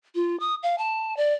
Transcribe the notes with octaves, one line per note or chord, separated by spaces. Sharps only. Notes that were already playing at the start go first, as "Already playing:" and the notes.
F4
D#6
F5
A5
D5